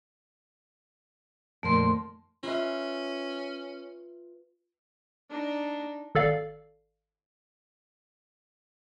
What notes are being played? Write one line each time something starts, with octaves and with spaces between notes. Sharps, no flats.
F2 A#2 D#3 A3 C6
C#4 F4 B4 E5
D4 D#4
G#1 A4 D5 F5 C7